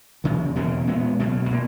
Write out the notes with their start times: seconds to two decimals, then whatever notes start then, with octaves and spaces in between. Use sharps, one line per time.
0.24 D#2 C#3 E3
0.55 E2 B2 A#3 C#4
0.87 A#2 G#3 B3
1.19 C#2 B2 F#3
1.51 B2 A#3